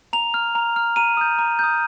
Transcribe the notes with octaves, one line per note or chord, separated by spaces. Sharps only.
A#5 F7
F6
A#5
F6
A#5 D#7
D#6 G6
A#5
D#6 G6